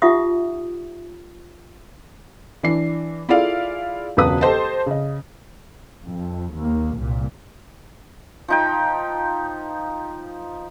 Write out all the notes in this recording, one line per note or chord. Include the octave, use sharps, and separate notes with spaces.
D#4 F4 G4 E5 F#5 D#6
E3 D4 C7
E4 F4 G#4 A4 D5 F5
E1 C#2 F#3 B4 D#6
G4 A4 C5 D#5 A5
C#3 D#5
F2
D#2 A#3
C2 A#2
F3 D#4 G5